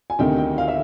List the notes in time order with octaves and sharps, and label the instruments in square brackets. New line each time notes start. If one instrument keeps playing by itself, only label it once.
[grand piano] G#5
D2 C3 D#3 G5
G5
F5
E5